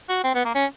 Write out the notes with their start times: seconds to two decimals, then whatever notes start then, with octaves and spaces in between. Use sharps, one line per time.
0.09 F#4
0.24 C4
0.35 B3
0.45 A#3
0.55 C#4